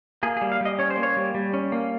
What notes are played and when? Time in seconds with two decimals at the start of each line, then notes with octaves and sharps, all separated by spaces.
0.23 A#3 G#4
0.37 G#4
0.41 G3
0.52 F5
0.61 G3 D#5
0.79 C#4 C#5
0.90 C5
0.97 A#3
1.03 C#5
1.17 G3
1.34 G3
1.54 C#4
1.72 A#3